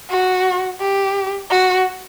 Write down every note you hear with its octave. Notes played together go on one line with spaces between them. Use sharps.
F#4
G4
F#4